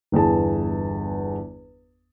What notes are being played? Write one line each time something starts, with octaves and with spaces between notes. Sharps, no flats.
G1 E2 G#4 A5